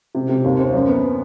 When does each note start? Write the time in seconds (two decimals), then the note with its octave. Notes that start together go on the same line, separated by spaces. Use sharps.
0.15 C3
0.29 C3
0.44 D#2
0.59 C4
0.73 F#2
0.88 B3